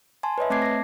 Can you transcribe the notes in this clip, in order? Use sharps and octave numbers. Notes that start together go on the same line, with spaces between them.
G#5 A5 C6
B4 C#5 D#5 E5
A3 C4 A5 D6 G#6 C7
A#6 C7